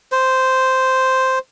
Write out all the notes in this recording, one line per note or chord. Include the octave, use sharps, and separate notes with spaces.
C5